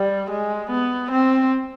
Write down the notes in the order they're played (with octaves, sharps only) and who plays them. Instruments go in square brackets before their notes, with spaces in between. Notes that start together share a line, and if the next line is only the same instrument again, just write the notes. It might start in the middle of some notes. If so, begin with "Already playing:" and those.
Already playing: [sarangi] G3
G#3
B3
C4